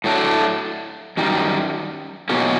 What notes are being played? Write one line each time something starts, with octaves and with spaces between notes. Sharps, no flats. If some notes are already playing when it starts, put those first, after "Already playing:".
A2 F#3 A3 D4
F#2 D#3 G3
E2 B2 F#3 A#3 C#4